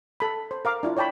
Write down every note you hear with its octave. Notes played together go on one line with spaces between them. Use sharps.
A4 B5
C5
A#4 F5 D6
D4 E4 F4
C#5 D5 G5 A5 B5